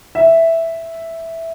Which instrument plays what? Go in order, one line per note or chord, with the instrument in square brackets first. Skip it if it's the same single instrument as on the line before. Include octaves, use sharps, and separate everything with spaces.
[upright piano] E5